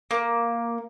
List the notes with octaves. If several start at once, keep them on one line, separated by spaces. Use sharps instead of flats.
A#3